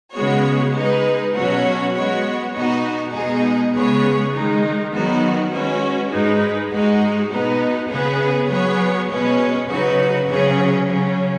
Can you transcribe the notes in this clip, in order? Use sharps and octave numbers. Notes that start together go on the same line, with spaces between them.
C#3 G#3 B3 F#4 C#5
G#3 D#4 B4
B2 F#3 C#4 F#4 C#5
G#3 B3 F#4 C#5
B2 B3 D#4 F#4
B2 G#3 D#4 G#4
C#3 G#3 B3 G#4 C#5
D#3 G#3 D#4
D#3 F#3 B3 D#4 F#4
G#3 C#4 F#4 B4
G#2 G#3 D#4 B4
G#2 G#3 D#4 F#4
B2 B3 D#4 B4
C#3 B3 G#4 B4
F#3 B3 G#4 C#5
B2 G#3 C#4 B4
C#3 F#3 D#4 F#4 B4
C#3 F#3 C#4 G#4 C#5
C#3 F#3 C#4